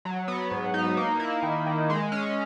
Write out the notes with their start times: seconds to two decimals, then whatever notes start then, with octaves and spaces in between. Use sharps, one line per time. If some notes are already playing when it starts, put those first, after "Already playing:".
0.05 F#3
0.28 B3
0.51 G#2
0.74 D#4
0.97 A#3
1.20 E4
1.43 D#3
1.66 D#3
1.90 G#3
2.12 C#4